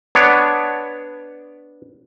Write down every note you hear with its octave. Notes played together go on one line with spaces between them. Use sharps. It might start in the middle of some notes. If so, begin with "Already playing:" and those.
B3 D4 C#5